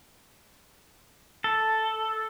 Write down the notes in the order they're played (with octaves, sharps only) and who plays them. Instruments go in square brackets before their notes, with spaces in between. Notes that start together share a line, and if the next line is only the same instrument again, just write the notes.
[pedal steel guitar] A4